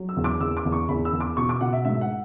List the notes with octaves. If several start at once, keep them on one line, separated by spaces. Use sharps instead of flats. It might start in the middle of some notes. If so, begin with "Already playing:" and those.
Already playing: F#3
E6
E2
D6
E2 E6
D6
E2
C#6
E2 B5
E6
E2
D6
B2 C#6
D6
B2 F#5
E5
G#2 E5
F#5